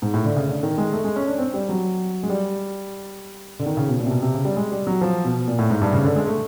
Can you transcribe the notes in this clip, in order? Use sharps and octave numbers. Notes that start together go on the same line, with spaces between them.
G#2
A2
D3
C#3
D3
D#3
G#3
A3
G#3
C#4
D4
C4
G3
F#3
G#3
G3
D3
D#3
C#3
B2
A#2
C3
B2
C3
C#3
G3
G#3
G3
F#3
F3
B2
A#2
A2
G#2
G2
C#3
D3
G#3
A3